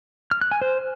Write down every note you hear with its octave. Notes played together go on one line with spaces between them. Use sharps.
F6
F#6
G#5
C5